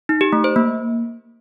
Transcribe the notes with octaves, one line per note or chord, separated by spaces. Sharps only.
D#4
G4
A3
C5
A#3